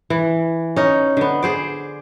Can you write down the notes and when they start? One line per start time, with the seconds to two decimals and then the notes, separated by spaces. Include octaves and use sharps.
0.10 E3
0.76 C#4 D#4
1.17 D3 B3
1.42 G#4 C5 D5